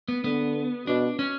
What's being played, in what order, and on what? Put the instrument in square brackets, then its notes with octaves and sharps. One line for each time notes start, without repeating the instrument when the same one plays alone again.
[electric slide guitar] B3
[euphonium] D3 [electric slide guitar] B3
[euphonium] B2 [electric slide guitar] D4
[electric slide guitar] C#4